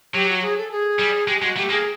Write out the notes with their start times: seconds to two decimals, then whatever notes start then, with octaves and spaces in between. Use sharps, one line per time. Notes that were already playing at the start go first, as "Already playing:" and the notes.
0.14 F#3 G4
0.29 F#4
0.42 G#4
0.57 A4
0.71 G#4
0.99 G3
1.27 G#3 G4
1.42 G#3 F#4
1.57 A3 G4
1.70 A#3 G#4